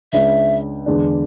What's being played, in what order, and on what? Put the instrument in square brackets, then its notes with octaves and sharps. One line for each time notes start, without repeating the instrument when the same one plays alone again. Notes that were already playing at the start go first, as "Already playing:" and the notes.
[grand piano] C#2 C#3 G#3 D4 [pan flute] E5
[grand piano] E2 D3 G#3 D4